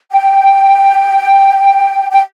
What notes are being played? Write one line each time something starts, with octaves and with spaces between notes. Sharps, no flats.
G5
G5